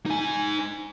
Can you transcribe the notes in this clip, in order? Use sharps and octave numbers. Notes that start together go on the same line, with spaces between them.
D#4 G#5